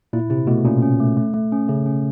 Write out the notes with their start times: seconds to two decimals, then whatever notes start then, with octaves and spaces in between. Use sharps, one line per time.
0.13 A#2 E4
0.30 C3 E4
0.47 B2 A3
0.65 A#2 C#4
0.82 C#4
1.00 A3
1.17 A3
1.34 A3
1.52 C#4
1.69 C#3 A3
1.86 C#4